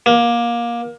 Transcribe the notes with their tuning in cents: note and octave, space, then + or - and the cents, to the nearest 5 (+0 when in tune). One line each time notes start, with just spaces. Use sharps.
A#3 +20